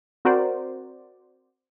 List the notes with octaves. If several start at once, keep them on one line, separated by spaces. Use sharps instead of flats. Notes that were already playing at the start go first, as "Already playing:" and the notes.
C4 F#4 A#4 C5 D5